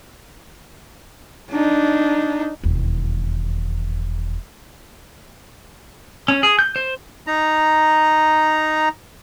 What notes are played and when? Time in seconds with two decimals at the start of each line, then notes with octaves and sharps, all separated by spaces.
1.51 D4 D#4
2.64 E1 D#2
6.28 C#4
6.43 G#4
6.59 G6
6.76 C5
7.27 D#4 A#5